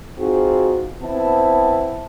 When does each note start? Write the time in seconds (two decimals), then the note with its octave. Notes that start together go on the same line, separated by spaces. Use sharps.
0.18 C4 D#4 F4 F#4 G#4
1.02 B3 C4 E4 A5